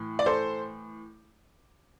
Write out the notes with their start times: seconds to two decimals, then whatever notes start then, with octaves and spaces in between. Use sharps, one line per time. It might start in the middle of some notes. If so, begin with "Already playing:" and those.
Already playing: A2 E3
0.19 D5
0.26 A4 C5